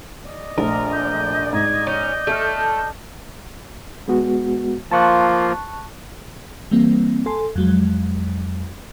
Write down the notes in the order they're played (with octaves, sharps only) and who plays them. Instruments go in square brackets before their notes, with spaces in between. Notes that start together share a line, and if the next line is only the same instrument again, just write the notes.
[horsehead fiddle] D5 D#5
[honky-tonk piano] A#1 A3 [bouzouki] A#4
[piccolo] G6
[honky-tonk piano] G#2 [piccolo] G#6
[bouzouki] C#4 [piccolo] G6
[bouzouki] A3 [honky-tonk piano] A4 F6
[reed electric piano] G#3 B3 F#4
[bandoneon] F3 A#3 F4 [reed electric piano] A5 C#6 F#6
[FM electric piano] E3 G3 A#3 C4
A4 G#5 C6
F2 F#3 G#3